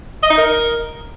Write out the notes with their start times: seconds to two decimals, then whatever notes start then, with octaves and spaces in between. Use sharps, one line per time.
0.23 D#5
0.30 D#4
0.37 A#4